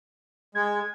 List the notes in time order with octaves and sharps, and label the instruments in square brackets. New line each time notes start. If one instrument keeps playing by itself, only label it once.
[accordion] G#3 [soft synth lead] G#6